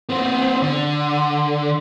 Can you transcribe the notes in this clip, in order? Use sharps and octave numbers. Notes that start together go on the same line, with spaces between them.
B3 C4
D3